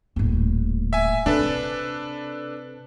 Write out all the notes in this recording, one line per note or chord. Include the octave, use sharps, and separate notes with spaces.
D#1 A2
E5 G#5
C3 D4 A4 B4